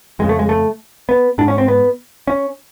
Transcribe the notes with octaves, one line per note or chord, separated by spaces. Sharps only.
F2 C#3 G#3
A3
G#3
A3
B3
G#2 D4
C#4
C4
B3
C#4